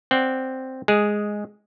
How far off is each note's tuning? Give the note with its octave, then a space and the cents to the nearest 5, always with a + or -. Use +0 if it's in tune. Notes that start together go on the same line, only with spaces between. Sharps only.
C4 +0 D5 +0 F#5 +0
G#3 +0 G#4 +0